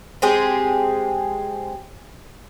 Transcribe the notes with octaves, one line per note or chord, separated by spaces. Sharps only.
G#3 C4 G4 G#4